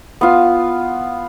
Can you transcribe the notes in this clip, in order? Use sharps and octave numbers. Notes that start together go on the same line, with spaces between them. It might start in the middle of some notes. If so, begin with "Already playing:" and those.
B3 F4